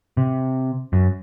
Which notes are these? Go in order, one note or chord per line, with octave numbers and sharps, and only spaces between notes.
C3
F#2